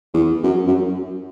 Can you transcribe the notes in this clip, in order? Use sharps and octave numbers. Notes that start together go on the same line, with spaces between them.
E2
F#2
F#2